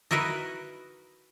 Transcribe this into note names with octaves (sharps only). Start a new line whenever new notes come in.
D#4 E4 F#4 A#4 B4